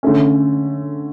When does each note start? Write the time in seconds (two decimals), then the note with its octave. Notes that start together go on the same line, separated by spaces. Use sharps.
0.03 D3 A3 C#4